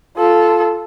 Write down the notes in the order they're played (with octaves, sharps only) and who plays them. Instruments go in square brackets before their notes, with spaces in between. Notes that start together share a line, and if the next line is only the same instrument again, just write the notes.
[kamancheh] F4 A4